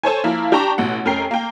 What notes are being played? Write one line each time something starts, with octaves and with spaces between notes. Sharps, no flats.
A4 C5 C#5 G#5
F3 A#3 E4
D4 G4 G5 A5 A#5 C#6
A1 B2 F#5
F1 C#4 A#4 G5 C7
A#3 G5